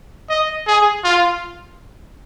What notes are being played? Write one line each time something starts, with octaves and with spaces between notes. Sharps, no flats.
D#5
G#4
F4